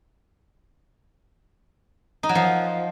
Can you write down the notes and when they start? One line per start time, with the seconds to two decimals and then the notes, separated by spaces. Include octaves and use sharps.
2.23 D#4
2.29 F#3
2.35 F3